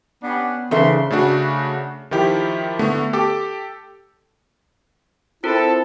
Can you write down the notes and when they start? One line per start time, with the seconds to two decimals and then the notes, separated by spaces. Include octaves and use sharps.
0.23 B3 C#4 D4 G4
0.71 C#3 E3 D4 D#4 A4 C5 E5 C6
1.10 C#3 A3 D4 F#4
2.11 D#3 F3 E4 G4
2.79 D3 A3 B3
3.13 G4 A4 D6
5.44 C4 E4 F4 A4 A#4